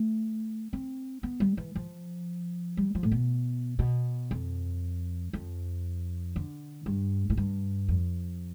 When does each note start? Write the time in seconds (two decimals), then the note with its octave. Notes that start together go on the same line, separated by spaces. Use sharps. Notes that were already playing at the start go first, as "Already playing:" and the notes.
Already playing: A3
0.73 C4
1.23 B3
1.40 G3
1.57 E3
1.75 F3
2.77 G3
2.95 F3
3.03 A2
3.12 B2
3.79 B2
4.31 F2
5.33 F2
6.36 D3
6.86 G2
7.30 A2
7.37 G2
7.88 F2